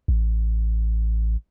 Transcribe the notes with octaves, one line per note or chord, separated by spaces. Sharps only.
A1